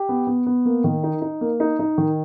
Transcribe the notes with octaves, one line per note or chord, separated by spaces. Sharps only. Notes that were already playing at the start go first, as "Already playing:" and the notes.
Already playing: G4
B3
B3
B3
A#3
D#3
D#4
D#4
A#3
D#4
D#4
D#3